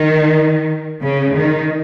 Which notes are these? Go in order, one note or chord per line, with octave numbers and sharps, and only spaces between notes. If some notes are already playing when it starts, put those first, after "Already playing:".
Already playing: D#3
C#3
D#3